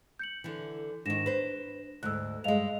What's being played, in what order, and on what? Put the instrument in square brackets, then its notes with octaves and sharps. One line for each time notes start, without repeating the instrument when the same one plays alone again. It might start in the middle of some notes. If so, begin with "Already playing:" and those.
[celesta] G6 C#7 F#7
[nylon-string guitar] D3 E3
[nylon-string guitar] G#2 D#3 [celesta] D4 A#6 E7
[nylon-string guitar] B4 C5
[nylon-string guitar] D2 G#2 [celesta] E6 F#6
[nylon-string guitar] G2 G#3 [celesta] D#5 F5 F7